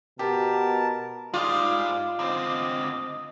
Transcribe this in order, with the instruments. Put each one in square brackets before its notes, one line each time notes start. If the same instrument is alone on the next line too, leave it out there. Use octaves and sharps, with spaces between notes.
[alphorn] B2 [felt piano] G4 [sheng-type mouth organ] A#4 A5
[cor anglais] G3 [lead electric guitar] G#3 D#4 [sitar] F4 [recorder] D6
[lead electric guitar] D3 C4 [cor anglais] D#5 [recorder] D6